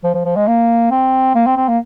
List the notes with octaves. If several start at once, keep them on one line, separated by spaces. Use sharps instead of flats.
F3
F3
F3
G#3
A#3
C4
A#3
C4
C4
A#3